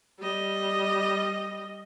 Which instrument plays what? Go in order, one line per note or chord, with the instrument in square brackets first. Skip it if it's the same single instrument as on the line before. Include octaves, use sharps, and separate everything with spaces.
[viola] G3 D#5